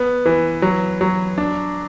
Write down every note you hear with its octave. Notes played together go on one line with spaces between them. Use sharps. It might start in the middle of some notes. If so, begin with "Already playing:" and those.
Already playing: B3
E3
F#3
F#3
D4